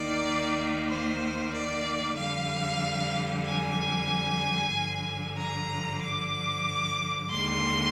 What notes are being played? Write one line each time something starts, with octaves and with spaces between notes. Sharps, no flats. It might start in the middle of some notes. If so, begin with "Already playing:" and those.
Already playing: D#2 D#3 A#3 D5
C5
D5
F2 D3 G3 F5
G#5
G2 D3 F3
A#5
D6
D#2 D3 G#3 C6